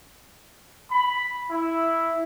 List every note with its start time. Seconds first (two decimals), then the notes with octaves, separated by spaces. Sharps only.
0.91 B5
1.50 E4